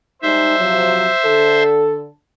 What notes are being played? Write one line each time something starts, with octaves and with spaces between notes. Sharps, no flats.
G3 G#3 D#4 C5 E5
C3 F3 F#3
D3 A4